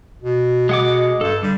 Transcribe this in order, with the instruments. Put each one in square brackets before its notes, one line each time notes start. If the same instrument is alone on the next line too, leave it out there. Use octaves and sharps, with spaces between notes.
[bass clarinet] B2
[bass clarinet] B2 [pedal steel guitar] G#3 F#5 D6
[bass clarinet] G2 [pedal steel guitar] A4
[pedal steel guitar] D3 [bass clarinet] G3